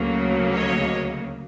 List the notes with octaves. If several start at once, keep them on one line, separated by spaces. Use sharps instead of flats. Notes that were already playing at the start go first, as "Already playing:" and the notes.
Already playing: D2 C#3 F#3 A#3
C#5 D#5